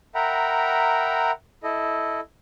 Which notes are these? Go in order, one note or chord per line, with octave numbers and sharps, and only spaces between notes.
A#4 E5 F#5 G5 A#5 B5
E4 A4 D#5